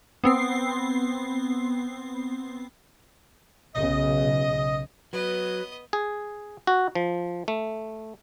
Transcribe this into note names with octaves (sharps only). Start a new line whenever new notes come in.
B3 C4 C7
B1 C#3 D#5
F#3 B3 B4 D#5
G#4
F#4
F3
A3